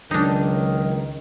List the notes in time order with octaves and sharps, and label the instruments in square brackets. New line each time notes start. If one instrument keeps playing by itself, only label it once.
[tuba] C#2 [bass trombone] D#3 [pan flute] F#3 [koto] D4 D#4